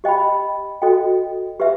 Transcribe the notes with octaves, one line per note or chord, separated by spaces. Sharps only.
G4 D#5 G5 B5
F#4 A4 D#5 G5
G4 B4 E5